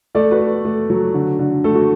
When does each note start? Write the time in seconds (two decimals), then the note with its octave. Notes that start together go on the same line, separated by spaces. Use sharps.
0.15 A3 A4 D5
0.31 F#4 B4
0.40 A3
0.65 A3
0.90 F#3
1.14 D3
1.39 D3
1.64 A3 A4
1.74 F#4